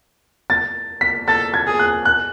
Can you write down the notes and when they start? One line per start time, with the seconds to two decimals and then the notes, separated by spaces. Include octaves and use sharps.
0.50 A6
1.01 B6
1.28 A4 A6
1.54 G#6
1.67 G#4
1.79 F#6
2.05 F#6